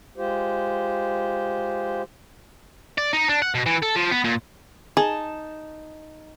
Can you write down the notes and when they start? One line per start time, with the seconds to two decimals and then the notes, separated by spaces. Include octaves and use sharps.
0.17 G#3 F4 G4 C5
2.98 D5
3.13 D#4
3.29 D4
3.42 F#5
3.55 B2
3.66 E3
3.82 A4
3.96 F3
4.11 B3
4.24 A#2
4.97 D#4 G#4 A5